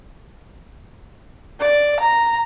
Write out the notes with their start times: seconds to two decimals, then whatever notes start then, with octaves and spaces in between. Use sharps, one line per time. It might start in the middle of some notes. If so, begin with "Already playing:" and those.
1.61 D5
2.00 A#5